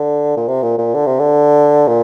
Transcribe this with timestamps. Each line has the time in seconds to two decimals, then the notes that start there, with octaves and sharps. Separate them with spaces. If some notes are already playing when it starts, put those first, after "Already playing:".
Already playing: D3
0.37 A#2
0.48 C3
0.63 A#2
0.78 A#2
0.94 D3
1.06 C3
1.19 D3
1.88 A#2